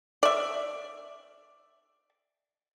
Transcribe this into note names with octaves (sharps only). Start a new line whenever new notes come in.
D5 E5